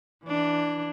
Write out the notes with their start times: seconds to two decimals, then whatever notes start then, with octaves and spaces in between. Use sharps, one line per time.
0.24 E3 D4